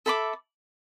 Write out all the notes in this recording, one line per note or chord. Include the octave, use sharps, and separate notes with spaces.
A4 E5 B5 D6